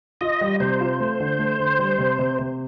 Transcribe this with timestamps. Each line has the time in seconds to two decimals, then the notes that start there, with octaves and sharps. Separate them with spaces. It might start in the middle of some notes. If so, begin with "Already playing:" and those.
0.21 F4 D#5
0.41 G3
0.60 C3 C5
0.81 F4
1.00 A3
1.20 D3
1.39 A3
1.60 D3
1.79 G3
1.98 C3
2.19 C3
2.39 C3